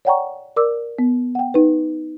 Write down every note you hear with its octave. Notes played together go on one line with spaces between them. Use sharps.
C#5 D5 F#5 G5 A#5 C#6
A#4 D5 D6 E6
B3
F#5 G5
D#4 B4